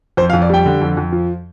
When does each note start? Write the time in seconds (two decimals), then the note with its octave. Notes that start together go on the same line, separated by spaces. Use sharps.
0.17 F2 C5
0.30 F5
0.33 F2
0.42 D5
0.50 G3 G5
0.66 D3
0.81 F2
0.97 F2
1.12 F3